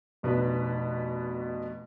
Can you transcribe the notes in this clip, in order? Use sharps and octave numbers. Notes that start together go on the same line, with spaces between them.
F1 B2 D4 B4